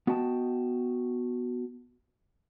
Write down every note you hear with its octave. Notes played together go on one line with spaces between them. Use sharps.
B3 F#4 D#5 G5 A5